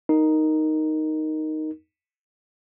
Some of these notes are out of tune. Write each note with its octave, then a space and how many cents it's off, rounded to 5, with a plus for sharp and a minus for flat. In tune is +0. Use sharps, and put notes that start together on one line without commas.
D#4 +0 A#4 -5